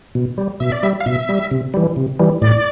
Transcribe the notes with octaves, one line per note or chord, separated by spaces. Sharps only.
B2
G3
B2 E5
D5
G3 E5
F5
B2 E5
G3
C3
E3 G3
C3
E3 G3
A2 D5